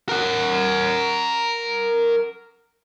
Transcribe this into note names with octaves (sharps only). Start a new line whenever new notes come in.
A#4 F#5